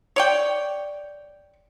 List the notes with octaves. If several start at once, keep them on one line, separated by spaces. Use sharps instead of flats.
C#5 D5 G5